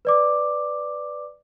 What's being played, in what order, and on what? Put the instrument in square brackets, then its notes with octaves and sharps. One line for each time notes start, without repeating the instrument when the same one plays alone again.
[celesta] B4 D5 D6